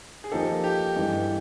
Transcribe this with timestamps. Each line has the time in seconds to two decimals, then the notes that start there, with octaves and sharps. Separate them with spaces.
0.24 G#4
0.31 F3 A#3 D#4 G4 A4
0.64 G4
0.96 G2 E3 G#3